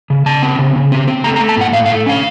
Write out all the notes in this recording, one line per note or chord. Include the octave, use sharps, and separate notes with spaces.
C#3
C#3 A5
C4
C#3
C#3
C4
C4
A3 A#5
A#5
A3
A5
A2 F#5
A2 F5
F5
A3
C#4 F5